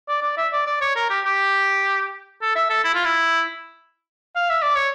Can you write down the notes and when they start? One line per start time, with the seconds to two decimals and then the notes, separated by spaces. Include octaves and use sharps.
0.08 D5
0.23 D5
0.37 E5
0.52 D5
0.66 D5
0.81 C#5
0.96 A#4
1.09 G4
1.25 G4
2.41 A4
2.55 E5
2.70 A4
2.84 E4
2.94 F4
3.05 E4
4.36 F5
4.50 E5
4.62 D5
4.75 C#5